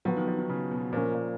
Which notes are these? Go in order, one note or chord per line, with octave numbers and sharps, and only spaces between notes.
F3 F#3 B3 F#4
D#3
F3
D#3
C#3
B2
A#2 F3 A#3 C#4
A#2